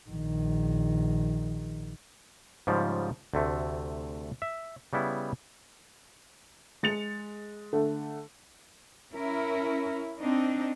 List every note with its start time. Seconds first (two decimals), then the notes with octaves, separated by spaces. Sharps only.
0.10 A#1 D#3
2.67 G#2 C#3 F3 G3
3.34 D2 C3 A3
4.42 E5
4.93 C#3 G3 B3 E4
6.83 G#3 A6 C#7 F7
7.73 D3 A3
9.13 C#4 E4 A#4
10.19 C4 D4 D#4